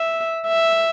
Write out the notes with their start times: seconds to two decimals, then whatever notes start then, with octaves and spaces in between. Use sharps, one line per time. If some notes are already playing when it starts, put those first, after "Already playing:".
Already playing: E5
0.47 E5